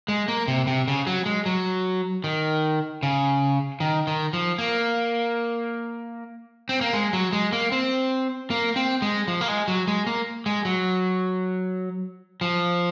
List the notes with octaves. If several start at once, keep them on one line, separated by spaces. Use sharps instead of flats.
G#3
A#3
C3
C3
C#3
F#3
G#3
F#3
D#3
C#3
D#3
D#3
F3
A#3
C4
A#3
G#3
F#3
G#3
A#3
C4
A#3
C4
G#3
F3
A#3
G#3
F#3
G#3
A#3
G#3
F#3
F3